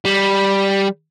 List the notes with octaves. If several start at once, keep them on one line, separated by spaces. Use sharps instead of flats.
G3